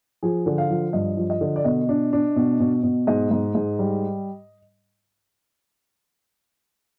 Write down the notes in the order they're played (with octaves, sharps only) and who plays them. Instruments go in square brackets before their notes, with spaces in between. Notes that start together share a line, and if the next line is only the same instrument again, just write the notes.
[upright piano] F3 G#4
D3
F5
F3
G2 D#5
F3
D#5
D3
D5
B2 D#5
D4
D4
B2
B2
B2
G#2 D#5
G#2
G#2
G3